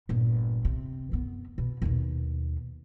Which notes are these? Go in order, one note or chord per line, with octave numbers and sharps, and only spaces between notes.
G1 A#2
C3
F#2 B3
B2
D#2 B2